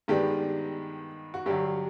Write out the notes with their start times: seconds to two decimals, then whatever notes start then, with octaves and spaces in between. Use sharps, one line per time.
0.08 G2 D#3 G#3 B3 D4 G4
1.34 F#4
1.46 G2 D3 F#3 G4